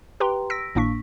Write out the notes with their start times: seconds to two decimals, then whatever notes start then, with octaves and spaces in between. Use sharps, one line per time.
0.20 G4 B4 G5 A#5 C6
0.50 E6 A#6 B6 D7
0.75 G#1 A2 A#3 D4 C#6 B6